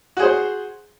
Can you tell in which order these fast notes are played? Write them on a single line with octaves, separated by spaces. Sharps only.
F#4 G#4 C5